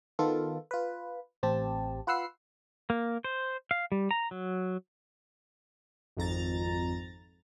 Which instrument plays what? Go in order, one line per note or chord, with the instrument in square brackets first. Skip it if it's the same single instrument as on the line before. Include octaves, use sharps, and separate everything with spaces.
[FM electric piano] D#3 B3 F4 A4
F4 B4
A1 C4 G4 A5
F4 B4 F#5 E6 C7
[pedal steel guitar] A#3
C5
F5
G3
A#5
F#3
[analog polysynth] G#1 F2 A#5 A6